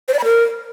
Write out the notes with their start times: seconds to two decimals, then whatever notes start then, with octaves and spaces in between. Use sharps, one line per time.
0.08 C5
0.14 D5
0.19 B5
0.24 A#4